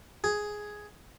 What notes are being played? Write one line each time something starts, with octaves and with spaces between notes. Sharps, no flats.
G#4